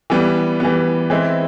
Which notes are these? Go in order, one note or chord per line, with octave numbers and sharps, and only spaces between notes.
E3 G3 B3
E3 G3 B3
E3 G#3 C4 E4